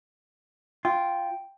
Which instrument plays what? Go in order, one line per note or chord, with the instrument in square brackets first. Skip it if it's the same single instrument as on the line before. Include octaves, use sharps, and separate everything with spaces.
[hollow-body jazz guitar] F4 [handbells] G5